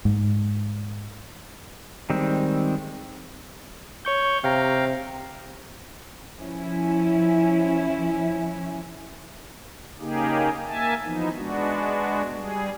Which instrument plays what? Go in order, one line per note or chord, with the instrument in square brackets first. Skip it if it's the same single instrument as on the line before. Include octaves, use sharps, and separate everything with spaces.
[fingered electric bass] G#2
[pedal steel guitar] D#3 G3 G#3 C4
[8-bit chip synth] C#5 C#6 G6
[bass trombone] C3 [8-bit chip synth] F5 G5 A#5
[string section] F3 C#4 E4
[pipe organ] C#3 A#3 D#4 G4 G#4
A#3 E5 G#5 A5
E3 F3 B3 D#4
G#3 B3 D4 F#4
G3 G#4